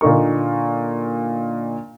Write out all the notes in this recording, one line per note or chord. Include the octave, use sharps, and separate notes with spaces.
A#2 D3 D#4 A#4 C#6